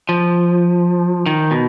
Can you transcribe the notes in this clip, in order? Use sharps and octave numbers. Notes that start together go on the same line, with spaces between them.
F3
D#3
B2